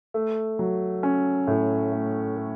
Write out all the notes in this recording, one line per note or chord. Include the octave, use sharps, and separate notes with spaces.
A3
F#3
C#4
A2
A3
A3